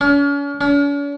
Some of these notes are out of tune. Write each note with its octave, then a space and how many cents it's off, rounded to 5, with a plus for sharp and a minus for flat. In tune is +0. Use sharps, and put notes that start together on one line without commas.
C#4 +40
C#4 +45